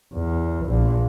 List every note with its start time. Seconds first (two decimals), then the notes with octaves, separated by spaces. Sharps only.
0.13 E2
0.66 A#1